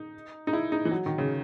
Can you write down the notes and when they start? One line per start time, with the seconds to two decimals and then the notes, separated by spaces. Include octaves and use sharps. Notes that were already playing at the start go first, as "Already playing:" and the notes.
Already playing: D#4
0.47 D#4
0.53 E4
0.72 D#4
0.85 E3
0.91 F#3
1.06 D#3
1.18 C#3